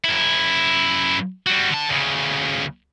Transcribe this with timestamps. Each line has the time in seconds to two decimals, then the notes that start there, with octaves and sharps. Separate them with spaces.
0.04 F#2 E4
1.46 G3 F#4
1.70 D3 A5
1.89 D2 C#3